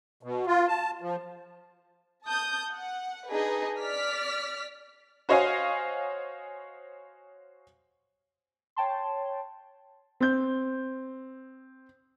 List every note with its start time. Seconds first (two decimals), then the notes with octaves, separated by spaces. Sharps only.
0.23 B2
0.47 F4
0.68 A5
1.01 F3
2.25 A5 D#6 G6
2.70 F#5
3.30 D4 D#4 G#4 B4 D#5
3.78 D5 F6 B6
5.29 F#4 C5 C#5 D#5 F5 G#5
8.76 C#5 G5 A5 C6
10.21 C4 G6